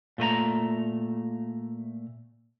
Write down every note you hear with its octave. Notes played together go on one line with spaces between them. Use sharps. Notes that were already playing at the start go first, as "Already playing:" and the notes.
A#2 A3 B4 A#5